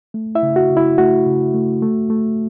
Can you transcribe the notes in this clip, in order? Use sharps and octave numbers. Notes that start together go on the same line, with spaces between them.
A3
E4 E5
C#3
F#4
C#3
E4
A3 F#4
C#3
A3
A3
A3